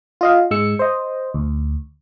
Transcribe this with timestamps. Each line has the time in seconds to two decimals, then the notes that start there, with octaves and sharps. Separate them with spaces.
0.21 F4 D#5 F5
0.51 G#2 G#3 E6 C#7
0.79 C5 D#5
1.34 D2